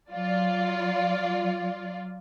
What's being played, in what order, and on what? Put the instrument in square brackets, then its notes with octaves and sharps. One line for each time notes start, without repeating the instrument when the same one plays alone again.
[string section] F#3 F4 D5